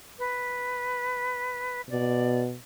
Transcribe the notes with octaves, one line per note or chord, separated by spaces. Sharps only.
B4
B2 D5